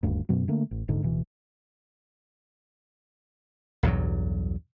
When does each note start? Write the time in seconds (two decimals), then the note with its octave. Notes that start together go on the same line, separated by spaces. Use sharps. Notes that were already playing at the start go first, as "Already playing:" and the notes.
0.03 D#1 D2 G2
0.29 F#2 B2 F#3
0.48 D3 A3 A#3
0.71 A1
0.88 D#1 G#2 D3
1.02 D1 B2 E3
3.83 B1 E2 G2 F#3